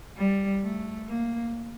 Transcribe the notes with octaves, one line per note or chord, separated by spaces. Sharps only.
G3
A3
A#3